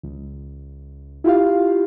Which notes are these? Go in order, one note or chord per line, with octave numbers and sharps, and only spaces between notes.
C#2
E4 F4 G4 F5